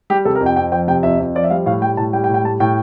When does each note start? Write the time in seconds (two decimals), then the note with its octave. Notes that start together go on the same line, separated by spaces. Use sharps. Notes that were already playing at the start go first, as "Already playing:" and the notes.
0.10 G3 G4
0.25 C3 A4
0.35 A#4
0.41 F2
0.46 G5
0.56 F2 G5
0.72 F3 G5
0.87 C3 G5
1.03 F2 E5
1.19 F2
1.35 F3 D5
1.44 E5
1.50 G3 F5
1.66 A2 F5
1.82 G3 G5
1.97 A2 A5
2.13 G3 G5
2.24 G5
2.29 A2
2.34 G5
2.44 G3 A5
2.60 A2 G5